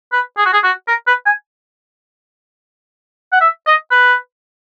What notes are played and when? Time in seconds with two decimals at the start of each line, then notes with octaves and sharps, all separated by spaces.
0.12 B4
0.37 G#4
0.46 F#4
0.53 G#4
0.63 F#4
0.88 A#4
1.07 B4
1.26 G#5
3.32 F#5
3.41 E5
3.67 D#5
3.91 B4